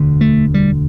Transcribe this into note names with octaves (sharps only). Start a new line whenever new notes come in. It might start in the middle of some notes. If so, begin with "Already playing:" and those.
Already playing: E1 D2 D3
A3
G3